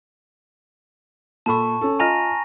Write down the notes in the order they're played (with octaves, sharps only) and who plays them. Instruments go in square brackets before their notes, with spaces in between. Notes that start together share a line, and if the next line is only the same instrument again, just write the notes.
[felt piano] A#2 A4 B5 [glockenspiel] A5 C#6
[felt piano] C#4 A4
[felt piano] F4 D#5 F6 [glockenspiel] G#5 A#5 A#6